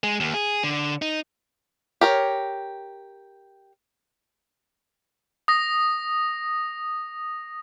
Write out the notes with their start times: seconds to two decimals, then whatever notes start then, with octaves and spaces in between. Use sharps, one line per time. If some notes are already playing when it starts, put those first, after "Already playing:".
0.04 G#3
0.20 D#2
0.34 G#4
0.64 D3
1.02 D#4
2.01 G4 A#4 C#5
5.48 D#6 A#6